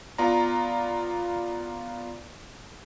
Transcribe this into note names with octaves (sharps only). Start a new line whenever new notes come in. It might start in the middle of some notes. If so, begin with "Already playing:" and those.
B3 F4 D5 A#5